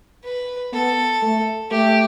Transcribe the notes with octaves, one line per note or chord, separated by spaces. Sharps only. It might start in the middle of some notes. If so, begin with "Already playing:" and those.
B4
B3 A4
A3
A3 G4